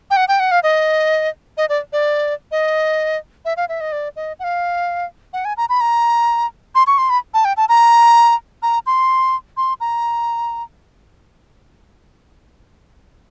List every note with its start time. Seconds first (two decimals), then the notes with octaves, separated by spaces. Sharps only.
0.11 G5
0.17 F#5
0.28 G5
0.40 F#5
0.51 F5
0.63 D#5
1.57 D#5
1.69 D5
1.93 D5
2.52 D#5
3.45 E5
3.57 F5
3.69 E5
3.81 D#5
3.92 D5
4.16 D#5
4.39 F#5
4.44 F5
5.33 F#5
5.45 G#5
5.57 A#5
5.69 B5
5.81 A#5
6.75 C6
6.87 C#6
6.98 C6
7.10 B5
7.34 A5
7.45 G5
7.57 A5
7.69 A#5
8.63 A#5
8.86 C6
9.57 C6
9.80 A#5